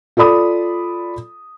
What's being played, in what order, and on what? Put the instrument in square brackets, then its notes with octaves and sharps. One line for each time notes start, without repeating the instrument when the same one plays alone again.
[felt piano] F4 A4 D5 B5 D#6